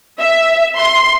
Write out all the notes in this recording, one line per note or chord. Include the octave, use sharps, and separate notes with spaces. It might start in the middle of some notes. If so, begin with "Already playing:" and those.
E5
C6